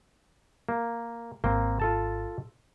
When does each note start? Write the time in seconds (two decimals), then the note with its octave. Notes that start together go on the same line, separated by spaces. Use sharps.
0.69 A#3
1.44 G#1 A#3 C4
1.80 F4 A4 A5